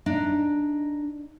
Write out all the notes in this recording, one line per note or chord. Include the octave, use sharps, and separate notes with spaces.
D4 D#4